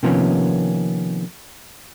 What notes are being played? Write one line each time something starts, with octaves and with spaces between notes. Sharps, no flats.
C3 D#3 F3 A#3 B3 C#4